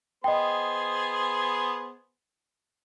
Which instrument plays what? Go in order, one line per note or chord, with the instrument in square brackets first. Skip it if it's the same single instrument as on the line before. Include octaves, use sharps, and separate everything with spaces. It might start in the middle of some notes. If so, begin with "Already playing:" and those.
[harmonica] B3 G#4 C5 [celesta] D#5 G5